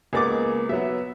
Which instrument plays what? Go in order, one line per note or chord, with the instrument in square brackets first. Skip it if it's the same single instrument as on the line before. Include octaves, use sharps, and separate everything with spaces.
[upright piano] C#2 B3 A6 [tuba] A#3 [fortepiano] G#4 D#5 D6
[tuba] B1 [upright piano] F#3 B3 [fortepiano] E5